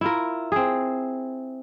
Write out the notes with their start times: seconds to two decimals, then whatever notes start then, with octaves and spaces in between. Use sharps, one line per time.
0.01 E4 F4 A#4
0.52 C4 G#4